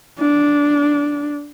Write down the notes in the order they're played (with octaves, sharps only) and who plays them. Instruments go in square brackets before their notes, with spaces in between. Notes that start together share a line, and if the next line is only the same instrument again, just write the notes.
[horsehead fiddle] D4